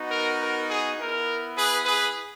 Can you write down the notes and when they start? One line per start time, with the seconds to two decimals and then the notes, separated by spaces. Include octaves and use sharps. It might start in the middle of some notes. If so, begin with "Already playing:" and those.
Already playing: B3 D#4 F#4
0.09 A#4
0.39 A#4
0.68 G#4
0.97 B3 E4 A#4
1.56 G#4 B4
1.85 G#4 B4